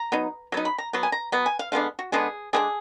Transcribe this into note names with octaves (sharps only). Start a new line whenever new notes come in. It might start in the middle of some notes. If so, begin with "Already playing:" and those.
Already playing: A#5
F#3 B3 D#4
F#3 B3 D#4
B5
A#5
F#3 B3
G#5
A#5
F#3 B3
G#5
F5
D3 G#3 B3 D4 F5
F#4
D3 G#3 B3 D4 G#4
D3 G#3 B3 D4 G#4